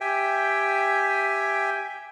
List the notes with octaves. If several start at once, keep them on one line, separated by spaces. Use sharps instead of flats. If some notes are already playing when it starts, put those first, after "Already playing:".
G4 E5 G5 G#5